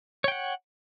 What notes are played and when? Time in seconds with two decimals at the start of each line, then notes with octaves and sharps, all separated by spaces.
0.24 C#5
0.28 G5
0.32 F#5